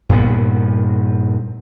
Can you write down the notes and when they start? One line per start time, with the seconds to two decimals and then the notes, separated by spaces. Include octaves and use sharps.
0.09 G2 A#2 B3